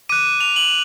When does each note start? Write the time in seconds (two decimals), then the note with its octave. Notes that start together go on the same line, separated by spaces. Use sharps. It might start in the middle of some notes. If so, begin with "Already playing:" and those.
0.09 D6 F#6 D#7
0.40 F7
0.56 F#7